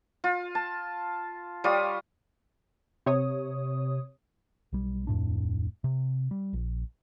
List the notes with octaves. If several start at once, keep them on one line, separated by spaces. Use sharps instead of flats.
F4
A5
G3 F4 C#5 D#6
C3 C#5 D#6
B1 G3
D1 F2 A2 D4
C3
G3
A#1